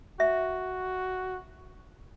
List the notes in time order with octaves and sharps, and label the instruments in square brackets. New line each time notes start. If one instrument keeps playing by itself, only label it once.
[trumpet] F#4 [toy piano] E5